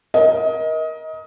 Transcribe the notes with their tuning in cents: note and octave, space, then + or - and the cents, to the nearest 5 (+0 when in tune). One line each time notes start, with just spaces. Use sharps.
A#4 +25 D#5 +25